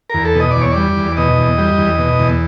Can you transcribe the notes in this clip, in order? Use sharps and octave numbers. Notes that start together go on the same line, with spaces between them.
E2 A#4
A4
B2
D#5
D5
E2
C#5
G3 D5
E2
B2 D#5
E2
G3
E2
B2
E2